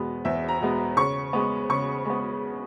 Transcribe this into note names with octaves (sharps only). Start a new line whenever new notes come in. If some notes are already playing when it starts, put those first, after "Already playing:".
Already playing: E2 B2 G#3 B3
E2 E5
A#5
B2 G#3 B3
C#3 C#6
G#3 B3
C#3 C#6
G#3 B3